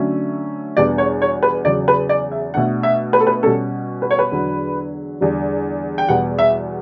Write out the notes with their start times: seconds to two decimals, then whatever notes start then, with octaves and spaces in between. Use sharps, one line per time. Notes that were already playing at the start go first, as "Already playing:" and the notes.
Already playing: D3 F#3 A3 C#4
0.77 E2 B2 G3 B3 D4 D5
0.98 C#5
1.22 C#5
1.43 B4
1.65 E2 C#3 F#3 D5
1.88 B4
2.09 D5
2.32 E5
2.54 B2 A3 D4 F#5
2.83 E5
3.13 B4
3.20 A4
3.27 B4
3.43 B2 G3 C#4 A4
4.02 B4
4.11 C#5
4.19 B4
4.31 E2 D3 F#3
5.21 E2 D3 G3
5.98 G5
6.09 E2 B2 G3 B3 F#5
6.39 E5